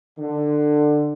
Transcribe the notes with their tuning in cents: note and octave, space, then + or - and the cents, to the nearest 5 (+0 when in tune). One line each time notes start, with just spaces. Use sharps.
D3 +20